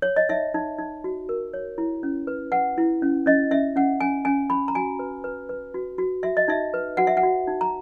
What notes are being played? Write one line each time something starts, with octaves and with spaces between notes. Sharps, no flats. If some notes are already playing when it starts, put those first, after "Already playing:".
C#5
D#5
D#4 E5
D#4
D#4
F#4
A#4
C#5
E4
C#4
B4
B4 F#5
E4
C#4
C#4 D#5
C#4 E5
C#4 F#5
C#4 G#5
C#4 G#5
C#4 B5
A#5
F#4 G#5
B4
B4
B4
F#4
F#4
F#4 E5
D#5
D#4 E5
B4
F#4 F#5
E5
F#5
F#4
D#4
A#5